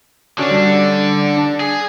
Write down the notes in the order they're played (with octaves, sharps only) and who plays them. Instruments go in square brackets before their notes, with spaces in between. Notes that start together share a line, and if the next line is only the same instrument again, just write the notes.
[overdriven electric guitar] D3 D4 [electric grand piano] C#4 F#4 D5
[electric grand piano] G3
D4
[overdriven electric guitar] G#4